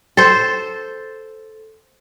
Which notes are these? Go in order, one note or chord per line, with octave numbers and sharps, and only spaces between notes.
A4 C5